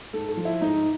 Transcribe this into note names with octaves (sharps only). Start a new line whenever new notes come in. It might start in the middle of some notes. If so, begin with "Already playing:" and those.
G#2 A4
A4
F3
E4
G#2 D#4